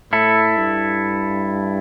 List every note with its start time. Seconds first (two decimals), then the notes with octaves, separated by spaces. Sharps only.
0.12 A2 E4 A4
0.57 G2